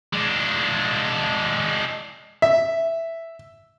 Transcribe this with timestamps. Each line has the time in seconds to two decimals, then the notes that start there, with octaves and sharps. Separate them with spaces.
0.13 G#3 D4
2.42 E5